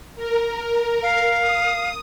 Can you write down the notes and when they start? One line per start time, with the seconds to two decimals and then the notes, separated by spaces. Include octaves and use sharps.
0.16 A#4
1.03 F5
1.41 D#6